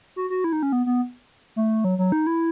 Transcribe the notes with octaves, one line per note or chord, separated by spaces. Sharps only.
F#4
F#4
E4
D#4
C#4
B3
B3
A3
F#3
F#3
D#4
E4